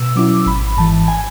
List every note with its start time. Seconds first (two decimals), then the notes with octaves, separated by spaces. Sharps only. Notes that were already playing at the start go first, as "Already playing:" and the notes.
Already playing: B2 E6
0.16 F#3 C#4 E4 D6
0.46 G#1 B5
0.77 G#2 E3 A5
1.08 G#5